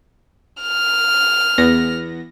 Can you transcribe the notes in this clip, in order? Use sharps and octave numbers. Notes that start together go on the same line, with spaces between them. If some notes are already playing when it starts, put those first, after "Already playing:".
F6
E2 B3 A#6